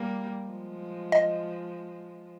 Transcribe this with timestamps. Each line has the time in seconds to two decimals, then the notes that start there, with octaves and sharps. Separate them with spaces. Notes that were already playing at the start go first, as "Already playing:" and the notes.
Already playing: G3 A#3
0.46 F3 G#3
1.12 D#5